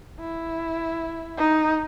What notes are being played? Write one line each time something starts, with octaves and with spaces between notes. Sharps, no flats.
E4
D#4